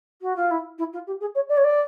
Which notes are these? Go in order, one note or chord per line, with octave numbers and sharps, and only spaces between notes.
F#4
F4
E4
E4
F4
G4
G#4
C#5
D5
C#5
D5